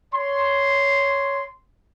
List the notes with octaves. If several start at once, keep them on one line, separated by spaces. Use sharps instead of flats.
C#5 C6